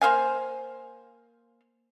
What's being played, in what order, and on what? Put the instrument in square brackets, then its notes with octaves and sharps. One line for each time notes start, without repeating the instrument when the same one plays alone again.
[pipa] A#3 C5 F5 G#5